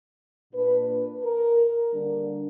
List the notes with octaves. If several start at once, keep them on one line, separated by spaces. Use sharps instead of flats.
A#2 A#3 D4 B4
A#4
D3 G3 A#3 D4